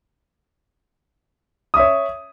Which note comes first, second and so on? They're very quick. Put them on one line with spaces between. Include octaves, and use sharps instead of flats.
D#6 E5 C#5